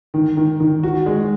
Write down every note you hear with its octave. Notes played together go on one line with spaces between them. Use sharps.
D#3
D#3
D#3
F#4
G#3